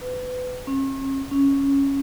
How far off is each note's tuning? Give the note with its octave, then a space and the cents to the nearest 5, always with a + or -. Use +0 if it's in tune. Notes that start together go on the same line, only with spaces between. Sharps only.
B4 +30
C#4 -40
C#4 -5